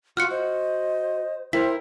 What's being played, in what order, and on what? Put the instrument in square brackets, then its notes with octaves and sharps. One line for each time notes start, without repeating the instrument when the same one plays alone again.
[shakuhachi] F4 [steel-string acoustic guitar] F#4 [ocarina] F5 [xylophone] F6 F#6 C#7
[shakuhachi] C5 [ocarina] D#5
[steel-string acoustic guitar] E4 A#4 [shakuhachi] C5 [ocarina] G5 [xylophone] B6